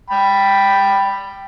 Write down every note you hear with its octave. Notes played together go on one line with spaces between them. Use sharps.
G5 B5